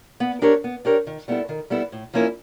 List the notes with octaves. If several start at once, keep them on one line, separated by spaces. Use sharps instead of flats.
B3
D4 G4 A#4 C#5
B3
D4 G4 A#4 C#5
D#3
G3 B3 E4 A4
D#3
G3 B3 E4 A4
A2
F3 A#3 C#4 E4